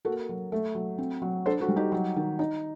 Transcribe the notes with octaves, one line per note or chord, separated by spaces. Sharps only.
A#3 F#4 A4
F#3
A3
F#3
C4
F#3
D4 A4 C5
F#4 A4
G3
D#4 G4
F#3
D#3
D#4